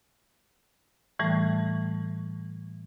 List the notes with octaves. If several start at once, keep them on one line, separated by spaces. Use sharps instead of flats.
A2 E3 G3 A3